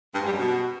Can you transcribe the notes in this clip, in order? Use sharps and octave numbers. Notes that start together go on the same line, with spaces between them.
G2
G#2
G3
F#2
B2